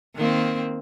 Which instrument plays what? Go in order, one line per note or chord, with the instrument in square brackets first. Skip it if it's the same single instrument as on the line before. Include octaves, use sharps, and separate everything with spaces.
[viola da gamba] D#3 A#3 C4